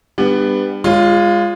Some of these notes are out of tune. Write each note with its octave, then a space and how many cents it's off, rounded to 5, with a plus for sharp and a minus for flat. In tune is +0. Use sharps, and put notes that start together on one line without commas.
G3 +25 B3 +5 D4 +25
G#3 -20 F4 +0 C#5 +0